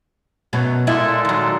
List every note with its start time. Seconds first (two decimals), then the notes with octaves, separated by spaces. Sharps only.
0.53 F#2 B2 F#3
0.87 A#2 G#3 E4 A4 D#5
1.25 D#3 F#3